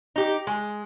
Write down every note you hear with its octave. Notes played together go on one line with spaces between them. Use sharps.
D#4 G4
G#3